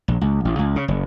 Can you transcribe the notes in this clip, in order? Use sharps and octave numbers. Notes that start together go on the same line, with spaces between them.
A#1
C#2
A1
C#2
C#3
F#1